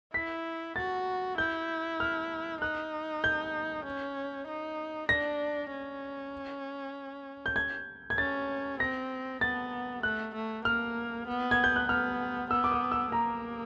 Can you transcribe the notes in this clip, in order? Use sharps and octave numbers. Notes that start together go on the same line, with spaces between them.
E4 B6
F#4 A6
E4 G6
F6
D#4 F#6
G6
C#4
D#4
D4 A#6
C#4
G6
G#6
G#6
C#4 A6
C4 A#6
B3 A6
A3 F#6
A3
A#3 F6
B3
G#6
G6
F#6
B3 F6
B3 E6
D6
D#6
E6
A#3 A#5